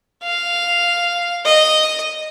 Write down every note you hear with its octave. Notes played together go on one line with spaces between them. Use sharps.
F5
D#5